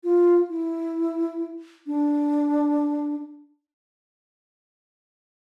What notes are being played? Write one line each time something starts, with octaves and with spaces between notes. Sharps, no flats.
F4
E4
D4